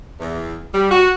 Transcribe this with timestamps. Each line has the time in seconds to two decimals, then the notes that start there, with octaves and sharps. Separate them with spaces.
0.20 E2
0.74 G3
0.91 F#4